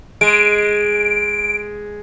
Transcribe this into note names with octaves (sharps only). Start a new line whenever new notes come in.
G#3 D7